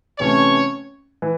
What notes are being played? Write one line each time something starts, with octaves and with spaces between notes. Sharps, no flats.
C3 E3 A3 C#4 C#5
E3